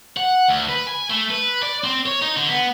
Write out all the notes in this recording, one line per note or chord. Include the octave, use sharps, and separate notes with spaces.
F#5
D2
B4
G#5
A3
B4
D5
C4
C#5
D#4
D3
B3